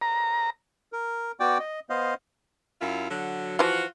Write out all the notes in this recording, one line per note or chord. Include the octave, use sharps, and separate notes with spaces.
A#5
A#4
B3 F#4 D5 G5 D6
D#5
B3 C5 D#5 F5
F#2 E4 F4
D3 F#3
E3 F3 F4 F#4